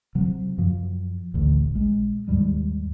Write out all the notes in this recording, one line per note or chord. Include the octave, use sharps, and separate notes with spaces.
C3 F#3
F#2 F3
A1 D2
A#1 G#3
D#2 G#2 G3 G#3